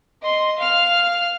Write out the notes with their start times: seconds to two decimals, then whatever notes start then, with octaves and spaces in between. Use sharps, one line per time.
0.22 D#5 C6
0.57 F5 F6